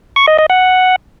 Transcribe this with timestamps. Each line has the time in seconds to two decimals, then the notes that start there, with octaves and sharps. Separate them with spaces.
0.16 C#6
0.27 D#5
0.39 D#5
0.50 F#5